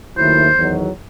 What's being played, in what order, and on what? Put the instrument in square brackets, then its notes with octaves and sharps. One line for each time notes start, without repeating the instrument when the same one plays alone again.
[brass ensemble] D#2 D#3 F#3 A3 E4 [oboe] C5
[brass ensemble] E2 D#3 F#3